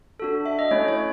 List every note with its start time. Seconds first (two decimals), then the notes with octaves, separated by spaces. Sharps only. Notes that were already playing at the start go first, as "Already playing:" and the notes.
0.20 D4 F#4 A4
0.46 E5
0.59 D#5
0.71 A3 C#4 E4 C#5
0.88 C#5